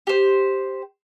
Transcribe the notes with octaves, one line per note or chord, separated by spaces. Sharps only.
G4 C5